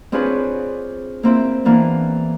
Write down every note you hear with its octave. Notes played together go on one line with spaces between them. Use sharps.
C4 D4 F4 G#4 B4 C#5
A#3 C4 E4
E3 A#3 B3 D4